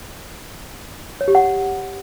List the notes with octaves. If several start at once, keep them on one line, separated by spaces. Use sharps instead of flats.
C#5
G4
F#5